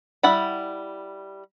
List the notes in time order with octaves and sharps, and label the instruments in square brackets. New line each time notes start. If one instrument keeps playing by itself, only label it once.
[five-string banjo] G3 E4 F#5 B5